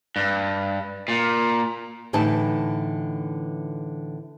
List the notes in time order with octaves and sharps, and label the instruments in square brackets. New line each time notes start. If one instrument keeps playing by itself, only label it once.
[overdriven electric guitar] G2
A#2
[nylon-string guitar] A2 D3 E3 D#4 A5